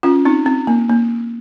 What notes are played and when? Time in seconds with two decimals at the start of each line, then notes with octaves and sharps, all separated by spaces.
0.03 C#4 F4
0.25 C4 D#4
0.46 C4
0.67 A#3
0.89 A#3